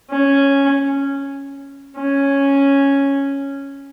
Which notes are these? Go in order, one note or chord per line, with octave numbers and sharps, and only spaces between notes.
C#4
C#4